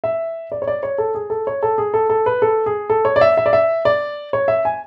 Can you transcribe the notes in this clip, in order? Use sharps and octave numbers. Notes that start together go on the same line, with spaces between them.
E5
D5
C#5
D5
C#5
A4
G#4
A4
C#5
A4
G#4
A4
A4
B4
A4
G#4
A4
C#5
D5
E5
E5
D5
E5
D5
C#5
E5
G#5